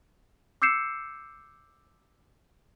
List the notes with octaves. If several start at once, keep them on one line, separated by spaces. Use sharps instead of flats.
D6 E6 G6 C7 C#7 E7